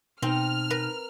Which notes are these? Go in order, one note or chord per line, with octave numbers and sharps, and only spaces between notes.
B2 C4 D#4 A5 F6
A#4 B4